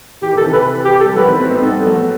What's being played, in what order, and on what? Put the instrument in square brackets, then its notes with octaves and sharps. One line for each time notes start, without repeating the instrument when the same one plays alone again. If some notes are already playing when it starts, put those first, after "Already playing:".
[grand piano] E3 [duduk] G4
[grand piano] D#3
[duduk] A4
[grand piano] C3 E3
[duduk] B4
G4
A4
[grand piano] G3
[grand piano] D#3 F#3 [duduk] B4
[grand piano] C4 E4
A3 C4
B3 D#4
C4
[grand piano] G3 B3 [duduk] A4
[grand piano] B3
F#3 A3